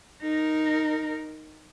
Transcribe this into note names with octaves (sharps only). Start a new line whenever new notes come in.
D#4 A#4